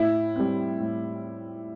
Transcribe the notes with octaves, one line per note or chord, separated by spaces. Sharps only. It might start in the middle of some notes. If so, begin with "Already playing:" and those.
Already playing: A2 E4
G3 C4
A2